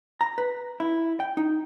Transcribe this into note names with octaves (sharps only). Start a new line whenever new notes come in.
A#5
B4
E4
G5
D#4